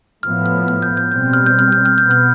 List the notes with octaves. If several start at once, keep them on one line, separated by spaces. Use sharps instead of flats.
A2 F3 B3 F6
F6
F6
G6
G6
B2 G3 C4 G6
F6
G6
F6
G6
F6
B2 B3 G6
F6